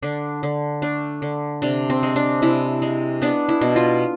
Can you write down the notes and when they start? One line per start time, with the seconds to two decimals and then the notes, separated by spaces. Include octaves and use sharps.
0.03 D3 D4
0.43 D3
0.82 A3 D4
1.22 D3
1.62 C3 D4
1.90 C4
2.03 G#3
2.16 D4
2.42 C3 E4
2.82 G#3
3.22 B3 D4
3.49 E4
3.61 B2
3.76 F4